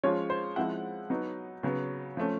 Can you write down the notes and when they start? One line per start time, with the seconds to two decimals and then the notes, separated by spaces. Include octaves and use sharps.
0.03 F3 G#3 C#4 F4 C#5
0.30 C5
0.56 F3 G#3 C4 E4 F#5
1.10 F#3 B3 D#4
1.63 C#3 F#3 B3
2.17 F3 A3 C#4